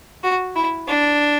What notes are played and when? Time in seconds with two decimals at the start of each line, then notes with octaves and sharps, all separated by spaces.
0.23 F#4
0.56 E4
0.88 D4